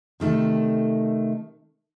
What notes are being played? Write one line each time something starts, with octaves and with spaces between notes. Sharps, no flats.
C3 D#3 A3 A4